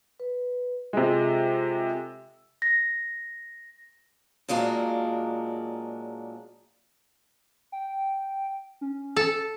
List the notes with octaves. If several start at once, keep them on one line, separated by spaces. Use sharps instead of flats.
B4
C3 G#3 F4 A4
A#6
A#2 F#3 G#3 A#3 D4
G5
C#4
A4